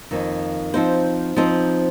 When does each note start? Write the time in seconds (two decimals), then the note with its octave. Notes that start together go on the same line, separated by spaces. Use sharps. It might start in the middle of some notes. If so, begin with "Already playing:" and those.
0.11 F2 D#3 A#3
0.74 F3 C4 D#4 C5
1.36 F3 C4 D#4 C5